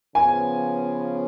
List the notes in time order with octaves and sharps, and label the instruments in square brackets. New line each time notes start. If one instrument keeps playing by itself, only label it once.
[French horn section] C#3 F3 B3 [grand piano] G#5